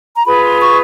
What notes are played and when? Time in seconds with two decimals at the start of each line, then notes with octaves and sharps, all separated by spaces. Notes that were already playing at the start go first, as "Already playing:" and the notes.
0.15 A#5
0.25 F4 G#4 B4 B5
0.43 C6
0.60 C#6